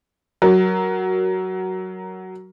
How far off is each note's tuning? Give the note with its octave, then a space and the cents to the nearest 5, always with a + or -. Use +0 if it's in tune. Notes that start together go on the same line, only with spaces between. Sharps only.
F#3 +10 A#4 +0